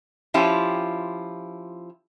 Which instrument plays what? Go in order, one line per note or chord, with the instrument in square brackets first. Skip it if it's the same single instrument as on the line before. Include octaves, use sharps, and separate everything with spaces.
[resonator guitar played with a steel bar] F3 C#4 E4 F4 G4